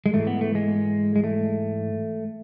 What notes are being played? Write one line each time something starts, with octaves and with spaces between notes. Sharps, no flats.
G#3
G#2 E3 A3
B3
A3
G#3
G#3
A3